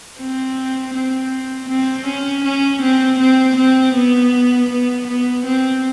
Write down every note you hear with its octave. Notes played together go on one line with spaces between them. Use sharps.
C4
C4
C4
C#4
C#4
C4
C4
C4
B3
B3
B3
C4